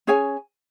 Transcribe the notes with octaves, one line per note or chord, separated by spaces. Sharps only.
C#4 G#4 C#5 G#5